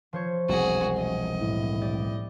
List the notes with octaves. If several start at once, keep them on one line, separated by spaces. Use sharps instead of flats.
F3 C5 C#5
E1 C2 F#4 G#4
D#5
A2
G4 D5